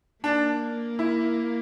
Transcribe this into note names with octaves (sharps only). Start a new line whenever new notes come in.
A#3 D4
E4